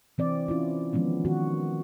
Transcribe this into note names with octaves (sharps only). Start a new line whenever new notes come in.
E3 C4 D5
C#4 E4 F4
D#3 F3 G#3 B3 C#4
D#3 F#4